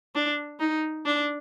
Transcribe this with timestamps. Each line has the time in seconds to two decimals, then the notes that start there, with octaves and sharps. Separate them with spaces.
0.15 D4
0.60 D#4
1.06 D4